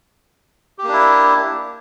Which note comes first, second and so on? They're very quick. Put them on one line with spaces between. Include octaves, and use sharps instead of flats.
G4 A#3 D4 E4